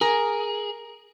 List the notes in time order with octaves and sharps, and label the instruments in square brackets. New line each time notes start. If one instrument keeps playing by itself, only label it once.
[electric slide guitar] G#4 [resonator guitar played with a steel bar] A#4